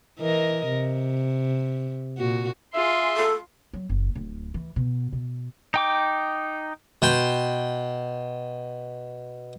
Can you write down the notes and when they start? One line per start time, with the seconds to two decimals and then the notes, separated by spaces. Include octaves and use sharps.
0.20 E3 A#4 D#5
0.69 C3
2.18 A#2 F#4
2.74 F4 G#4 E5 C6
3.17 A4
3.73 F#3
3.89 F#1
4.15 D1
4.54 E3
4.76 B2
5.13 B2
5.74 D#4 G5 D6
7.02 B2 G5 C6